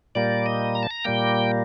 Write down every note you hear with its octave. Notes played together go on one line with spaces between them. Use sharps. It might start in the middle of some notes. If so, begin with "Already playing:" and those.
A#2 G3 A#3 D5
D#5
A#5
A5
A#5
A#2 G3 A#3 G5